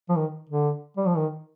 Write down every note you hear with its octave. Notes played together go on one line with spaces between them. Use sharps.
F3
D#3
D3
G3
F3
D#3